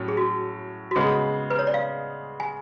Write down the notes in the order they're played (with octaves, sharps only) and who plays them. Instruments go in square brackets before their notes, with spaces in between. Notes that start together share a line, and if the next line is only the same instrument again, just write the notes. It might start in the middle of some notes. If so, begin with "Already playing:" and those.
Already playing: [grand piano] A2 F#3 C#4
[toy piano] G#4
F#4
F#4
[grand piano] C#3 G#3 B3 [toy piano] G#4
[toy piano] B4
C#5
D5
F5
G#5